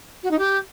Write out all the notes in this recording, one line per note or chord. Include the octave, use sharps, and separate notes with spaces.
F#4
D#4
G4